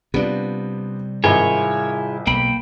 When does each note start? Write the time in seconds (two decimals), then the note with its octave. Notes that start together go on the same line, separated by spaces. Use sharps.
0.14 C3 G3 B3 D4 F4
1.24 G#1 E4 F4 G#4 A#4 C#5
2.27 B1 A#3 G5 B5